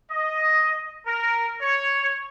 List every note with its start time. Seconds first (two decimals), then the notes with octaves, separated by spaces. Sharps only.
0.10 D#5
1.06 A#4
1.61 C#5